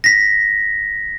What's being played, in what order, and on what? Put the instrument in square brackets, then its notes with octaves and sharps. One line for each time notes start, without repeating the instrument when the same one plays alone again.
[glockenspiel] A#6 B6